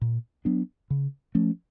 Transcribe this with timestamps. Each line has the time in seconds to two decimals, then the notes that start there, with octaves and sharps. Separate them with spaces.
0.01 A#2
0.45 F#3 B3 D4
0.90 C#3
1.35 F3 A3 C#4